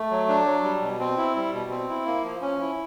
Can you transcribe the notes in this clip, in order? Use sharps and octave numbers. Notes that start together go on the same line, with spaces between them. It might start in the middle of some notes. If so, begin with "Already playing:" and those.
Already playing: A3
F#3
D4
F#3
G3
B2
C4
E4
G3
B2
C4
E4
A#3
F3
C#4
E4